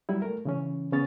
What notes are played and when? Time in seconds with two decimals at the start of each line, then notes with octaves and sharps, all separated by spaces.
0.09 F#3 G3 E4
0.22 A3 A#4
0.45 C#3 E3 C#4
0.92 C#3 B3 C#4 C#5 A6